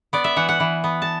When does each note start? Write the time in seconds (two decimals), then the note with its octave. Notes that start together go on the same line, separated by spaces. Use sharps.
0.13 B3 D5
0.24 E5
0.36 E3 F#5
0.49 F#5
0.60 E3
0.84 B3
1.02 A5